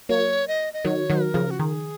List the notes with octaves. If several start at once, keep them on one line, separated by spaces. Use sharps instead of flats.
F#3 A#3 C#5
D#5
D#5
D#3 F#3 C#5
D#3 F#3
A#4
C#3 F3
F#4
D#3 G#4